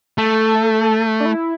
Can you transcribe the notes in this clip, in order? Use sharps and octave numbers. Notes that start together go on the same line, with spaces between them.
A3 A4
D4
E4